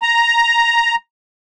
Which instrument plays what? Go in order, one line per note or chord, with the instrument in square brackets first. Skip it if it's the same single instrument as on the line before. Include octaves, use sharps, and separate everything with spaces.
[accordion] A#5